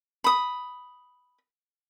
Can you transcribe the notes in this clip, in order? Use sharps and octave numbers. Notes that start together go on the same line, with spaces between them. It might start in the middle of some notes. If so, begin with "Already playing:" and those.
B5 D#6